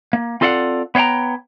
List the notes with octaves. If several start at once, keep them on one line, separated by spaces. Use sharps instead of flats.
A#3
C4 F4 A4 D5 F5 F#5
B3 C#5 F5 G5 A#5